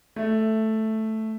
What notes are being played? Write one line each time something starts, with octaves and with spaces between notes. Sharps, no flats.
A3